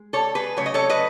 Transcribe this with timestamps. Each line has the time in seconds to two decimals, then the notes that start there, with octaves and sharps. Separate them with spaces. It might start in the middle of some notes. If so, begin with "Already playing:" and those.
Already playing: G#3
0.13 A4 C#5
0.35 G#4 B4
0.57 C#3 F#3 A3 C#5
0.66 D#5
0.74 A4 C#5
0.90 B4 D#5